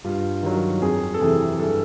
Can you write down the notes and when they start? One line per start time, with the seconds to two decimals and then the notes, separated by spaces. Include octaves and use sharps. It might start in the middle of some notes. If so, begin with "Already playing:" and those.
0.04 G2 F4
0.43 D#3 F#3
0.81 F2 G#4
1.14 A4
1.20 C3 E3 G#4
1.59 G2 A4